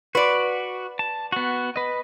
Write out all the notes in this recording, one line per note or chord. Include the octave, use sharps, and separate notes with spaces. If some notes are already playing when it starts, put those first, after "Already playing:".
F#4 B4 D5
A5
B3 F#4
B4 D#5